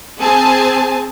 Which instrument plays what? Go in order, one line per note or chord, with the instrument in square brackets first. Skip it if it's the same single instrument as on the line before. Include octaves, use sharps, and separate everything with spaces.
[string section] C4 G#4 G#5 A5